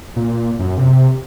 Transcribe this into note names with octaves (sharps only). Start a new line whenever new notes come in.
A#2
F#2
C3